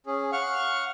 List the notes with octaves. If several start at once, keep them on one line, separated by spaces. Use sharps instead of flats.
C#4 G#4
F5 F#5 C#6 F6